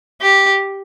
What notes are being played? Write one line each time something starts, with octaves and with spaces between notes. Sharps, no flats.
G4